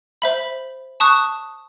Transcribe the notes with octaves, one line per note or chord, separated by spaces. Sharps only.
C5 E5 B5
A5 C#6 D#6 F#6